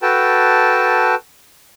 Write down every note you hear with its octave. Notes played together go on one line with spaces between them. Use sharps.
F#4 A4 B4 G5 A5